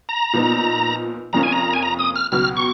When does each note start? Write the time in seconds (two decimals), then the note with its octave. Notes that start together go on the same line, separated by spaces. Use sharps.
0.09 A#5
0.33 A#2 F3 B3 D#4
1.33 F1 F2 F3 A#3 C#4 A#5
1.43 G#5
1.52 A#5
1.74 G#5
1.82 A#5
1.99 D#6
2.16 F6
2.32 C#2 B2 F#3 B3 F#4 F6
2.57 C#6